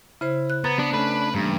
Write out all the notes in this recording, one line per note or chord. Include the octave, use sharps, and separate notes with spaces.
C#3 E4 C5
F#6
B3 B4 A#5 G#6 A6
B3 D4
A3 C#4 B4
G2 E3 A#3